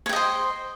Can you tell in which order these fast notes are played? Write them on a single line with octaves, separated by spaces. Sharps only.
C#5 G5 D#5 C5